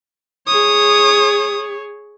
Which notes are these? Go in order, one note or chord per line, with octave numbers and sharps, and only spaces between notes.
G#4 C#5 D#6